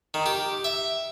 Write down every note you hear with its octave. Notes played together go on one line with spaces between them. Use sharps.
D#3
G4
E5